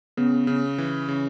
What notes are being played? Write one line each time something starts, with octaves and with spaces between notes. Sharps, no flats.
C#3 B3
C#3
E3
C#3